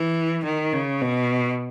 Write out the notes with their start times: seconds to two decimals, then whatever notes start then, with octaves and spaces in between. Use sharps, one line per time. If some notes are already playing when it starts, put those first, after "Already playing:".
Already playing: E3
0.45 D#3
0.73 C#3
1.01 B2